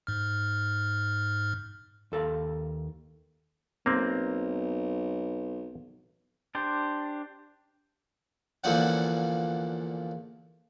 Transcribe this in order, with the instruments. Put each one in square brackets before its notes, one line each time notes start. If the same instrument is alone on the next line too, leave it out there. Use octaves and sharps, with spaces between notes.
[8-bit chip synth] G#2 F6
[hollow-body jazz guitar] D#2 A4 F5
[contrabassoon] B1 [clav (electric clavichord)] A#3 C4
[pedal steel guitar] D4 G4 C5
[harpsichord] E2 A#2 D3 F3 C#4 F#5